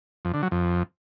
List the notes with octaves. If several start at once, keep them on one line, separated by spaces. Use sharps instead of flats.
F2
D3
F#3
F2